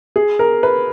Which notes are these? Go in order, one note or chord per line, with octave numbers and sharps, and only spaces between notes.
G#4
A#4
B4